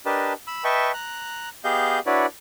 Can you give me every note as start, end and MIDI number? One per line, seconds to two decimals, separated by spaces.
0.06 0.33 62
0.06 0.33 67
0.06 0.33 70
0.06 0.33 71
0.06 0.33 75
0.06 0.33 81
0.47 0.64 83
0.47 0.64 88
0.64 0.92 71
0.64 0.92 75
0.64 0.92 76
0.64 0.92 79
0.64 0.92 81
0.64 0.92 85
0.94 1.49 82
0.94 1.49 90
1.64 1.99 59
1.64 1.99 67
1.64 1.99 68
1.64 1.99 75
1.64 1.99 77
1.64 1.99 91
2.06 2.26 62
2.06 2.26 64
2.06 2.26 66
2.06 2.26 71
2.06 2.26 73
2.06 2.26 74